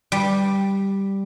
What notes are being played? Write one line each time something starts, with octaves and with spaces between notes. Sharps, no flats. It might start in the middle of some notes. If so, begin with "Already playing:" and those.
G3